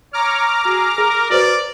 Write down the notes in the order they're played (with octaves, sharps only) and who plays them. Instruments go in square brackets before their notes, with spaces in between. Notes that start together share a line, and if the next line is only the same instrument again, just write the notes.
[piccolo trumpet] C#5 [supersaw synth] A#5 D6 F6
[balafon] F#4 [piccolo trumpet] G#4
[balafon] G#4 [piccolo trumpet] A#4
[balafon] F#4 B4 C5 [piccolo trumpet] D5